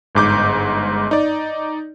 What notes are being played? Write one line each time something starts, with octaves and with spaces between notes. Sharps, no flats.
G1 G#2 D6 G6
D#4 D5